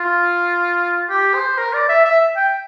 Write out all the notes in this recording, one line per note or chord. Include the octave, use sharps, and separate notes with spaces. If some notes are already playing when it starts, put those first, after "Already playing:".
Already playing: F4
G4
C5
A#4
D5
E5
E5
G5